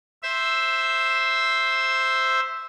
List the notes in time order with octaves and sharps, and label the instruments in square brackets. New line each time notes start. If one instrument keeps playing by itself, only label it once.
[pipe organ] C5 E5 E6